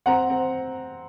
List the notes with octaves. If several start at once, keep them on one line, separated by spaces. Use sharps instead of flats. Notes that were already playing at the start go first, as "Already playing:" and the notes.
C4 F#5 A#5
C4